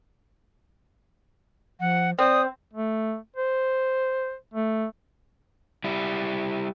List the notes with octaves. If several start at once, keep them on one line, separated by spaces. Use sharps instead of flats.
F3 F#5
C4 D5 D#6
A3
C5
A3
G3 E4